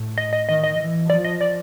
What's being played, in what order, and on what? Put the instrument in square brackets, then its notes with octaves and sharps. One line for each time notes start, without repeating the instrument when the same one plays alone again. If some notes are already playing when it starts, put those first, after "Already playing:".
Already playing: [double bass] A2
[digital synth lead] D#5
D#5
[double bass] D#3 [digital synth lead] D#5
[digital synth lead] D#5
[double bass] E3
[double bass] F3 [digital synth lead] D5
[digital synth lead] D#5
D5